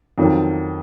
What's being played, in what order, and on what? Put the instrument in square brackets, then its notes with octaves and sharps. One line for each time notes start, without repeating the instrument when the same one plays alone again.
[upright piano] F2 D#3 F#3 C#4 F4